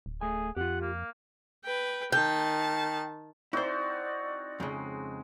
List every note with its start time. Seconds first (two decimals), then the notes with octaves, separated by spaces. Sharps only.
0.06 D1
0.21 A3 G#4 G#5
0.57 F2 F4 G4 F#5
0.81 A#3
1.65 B4 G5
2.12 D#3 G5 A5
3.53 C4 D#4 E4 F#4 C5 D5
4.60 F2 C#3 G#3